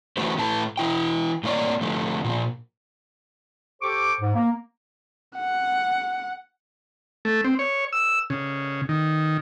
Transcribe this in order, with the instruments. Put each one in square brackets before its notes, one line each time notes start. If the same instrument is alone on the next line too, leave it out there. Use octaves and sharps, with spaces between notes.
[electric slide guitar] E3 A3 C#4 F#4 B4 C5
A2 A3 E4 B4 A5
E3 E4 G5
A2 A#3 C#4 C#5 D5
D3 F3 A3
A#2 E3 F3
[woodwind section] G4 A4 C5 C#6 D6
G#2
A#3
[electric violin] F#5
[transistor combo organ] A3
C4
C#5
E6
C#3
D#3